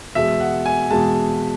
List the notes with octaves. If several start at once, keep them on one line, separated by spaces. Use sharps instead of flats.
E2 B2 G#3 E5
F#5
G#5
E2 B2 G#3 A5